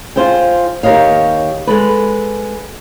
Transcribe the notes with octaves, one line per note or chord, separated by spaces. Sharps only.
F4 G4 G#4 C5 F5 G5
D#2 G4 A#4 C#5 D#5 F5
G#3 A4 B4